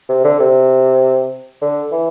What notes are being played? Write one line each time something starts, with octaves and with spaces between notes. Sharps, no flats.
C3
D3
C3
D3
E3